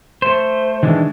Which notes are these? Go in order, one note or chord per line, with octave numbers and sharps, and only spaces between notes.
A3 C5
D#3 E3 G#3 D4